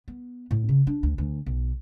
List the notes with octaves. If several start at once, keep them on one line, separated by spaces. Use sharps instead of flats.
B3
A2
C#3
D4
D2
D2
B1